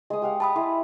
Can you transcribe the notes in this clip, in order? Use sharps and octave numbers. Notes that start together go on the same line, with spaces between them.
G#3 D#6
G4 F5 F#5
F#5 A5 B5 D#6
E4 G#4 C6